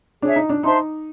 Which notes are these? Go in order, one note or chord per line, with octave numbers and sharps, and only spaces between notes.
D4 G#4 C#5 E5
D#4
D4
D#4 C5 E5 A5 C6